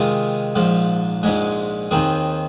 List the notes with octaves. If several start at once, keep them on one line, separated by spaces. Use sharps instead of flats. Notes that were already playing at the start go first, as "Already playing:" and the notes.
Already playing: C3 D#3 G#3 F4 G#4
A#1 G#2 F3
A#1 G#2 G#3
D#2 D#3 C4 G#4